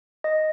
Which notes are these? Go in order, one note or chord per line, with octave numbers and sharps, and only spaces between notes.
D#5